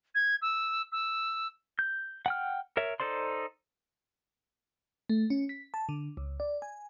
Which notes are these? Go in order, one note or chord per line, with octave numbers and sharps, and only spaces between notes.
G#6
E6
E6
G6
F#5 G5 F6
A#4 C#5 E5
D#4 A4 C5 D5 C6
A3
C#4
B6
A5
D3
C#2
D5
G#5